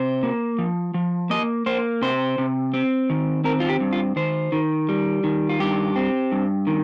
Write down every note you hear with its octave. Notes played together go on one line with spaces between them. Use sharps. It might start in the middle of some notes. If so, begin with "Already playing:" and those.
Already playing: C3 C5
A#3
F3
F3
A#3 D#5
A#3 C5
C3 C5
C3
C4
D#3
C4 A#4
F4
G4
G2
F4
D#3 C5
D#3
G3
D#3
F4
G2 G4
C4
G2
D#3